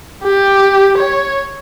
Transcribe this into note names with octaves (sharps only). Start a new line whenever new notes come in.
G4
C#5